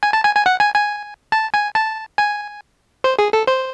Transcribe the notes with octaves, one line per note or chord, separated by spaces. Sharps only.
G#5
A5
G#5
G#5
F#5
G#5
G#5
A5
G#5
A5
G#5
C5
G#4
A4
C5